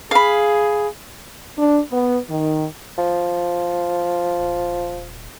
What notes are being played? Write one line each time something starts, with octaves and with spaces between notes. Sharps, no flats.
G#4 F5 B5
D4
B3
D#3
F3
D#1